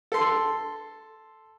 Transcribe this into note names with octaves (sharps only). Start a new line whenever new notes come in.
A4 C6